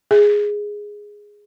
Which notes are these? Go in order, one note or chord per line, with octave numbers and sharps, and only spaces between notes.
G#4